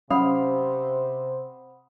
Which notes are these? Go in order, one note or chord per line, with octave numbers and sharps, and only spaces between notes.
C3 F#3 C#4 C5 F5 F#5 B5 D#6